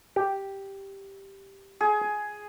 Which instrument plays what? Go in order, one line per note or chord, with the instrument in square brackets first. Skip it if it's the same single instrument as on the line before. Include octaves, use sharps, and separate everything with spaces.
[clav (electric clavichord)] G4
[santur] G#4